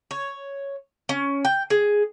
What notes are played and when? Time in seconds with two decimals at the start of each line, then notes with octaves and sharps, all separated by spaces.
0.11 C#5
1.09 C#4
1.45 G5
1.70 G#4